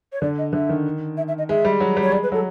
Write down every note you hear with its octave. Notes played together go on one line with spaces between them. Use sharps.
C#5
D3 D5
D#5
D3 E5
D#3
E5
E5
D#5
G#3 E5
G3
F#3
G3
C#5
G#3 D5
B4
F#3 A4